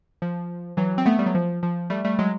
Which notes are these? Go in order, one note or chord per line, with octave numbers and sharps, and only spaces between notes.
F3
E3 F#3
C4
A3 B3
G3
F#3
F3
F3
G3 A3
G3 A3
F#3 G#3